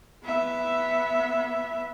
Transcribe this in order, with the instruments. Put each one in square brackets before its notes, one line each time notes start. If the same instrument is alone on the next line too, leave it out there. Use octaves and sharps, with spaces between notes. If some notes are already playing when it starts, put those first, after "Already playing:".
[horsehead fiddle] B3 E5